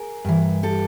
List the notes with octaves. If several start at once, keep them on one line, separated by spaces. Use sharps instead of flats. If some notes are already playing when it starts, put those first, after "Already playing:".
Already playing: G#4 A#4
G2 E3
G4 A4